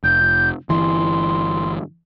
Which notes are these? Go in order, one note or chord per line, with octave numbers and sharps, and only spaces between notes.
F1 G6
G1 E3 C6